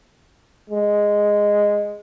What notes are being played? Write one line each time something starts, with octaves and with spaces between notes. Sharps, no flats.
G#3